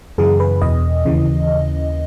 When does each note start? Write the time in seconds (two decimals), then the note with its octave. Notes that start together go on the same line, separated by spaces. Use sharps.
0.18 F#2 C#3 E3 G#4
0.40 B4
0.62 E2 B2 D#5
1.05 D#2 C#3 E3